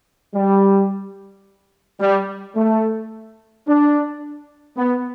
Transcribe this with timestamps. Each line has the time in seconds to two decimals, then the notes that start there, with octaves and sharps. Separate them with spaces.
0.34 G3
2.01 G3
2.55 A3
3.67 D4
4.77 B3